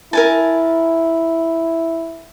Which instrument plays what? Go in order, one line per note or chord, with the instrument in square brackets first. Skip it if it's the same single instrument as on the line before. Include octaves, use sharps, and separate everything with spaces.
[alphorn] E4 [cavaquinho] A#4 G#5 A5